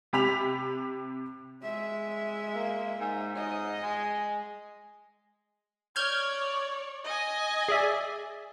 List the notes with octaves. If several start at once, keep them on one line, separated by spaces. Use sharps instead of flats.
C3 G4 B5 B6 F7
G#3 E5
A#3
G#2
G#2 D#5
G#3
C#5 D5 F6 G6 G#6
D#5 G#5
G#4 D5 E5